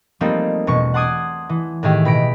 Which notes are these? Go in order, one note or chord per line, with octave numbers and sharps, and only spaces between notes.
F3 G3 A3 A#3 C4 D#4
E1 B2 C#6
F#5 A5 C6 D6 D#6 G#6
E3
A2 D#3 G4 G#4 E5
B2 B5 A#6 D7